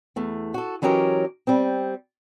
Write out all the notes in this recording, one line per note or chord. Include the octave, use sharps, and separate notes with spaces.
E2 A3
F#4 A4
E3 F#3 C#4 G4 A#4 D#5
G3 C4